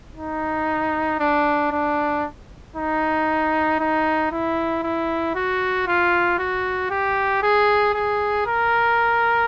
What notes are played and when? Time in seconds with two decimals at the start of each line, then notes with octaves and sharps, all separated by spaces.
0.16 D#4
1.19 D4
1.71 D4
2.76 D#4
3.80 D#4
4.31 E4
4.83 E4
5.35 F#4
5.87 F4
6.38 F#4
6.91 G4
7.43 G#4
7.94 G#4
8.46 A#4